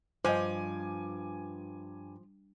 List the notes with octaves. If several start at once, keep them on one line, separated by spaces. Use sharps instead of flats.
G2 F3 C5 D#5 G#5 D6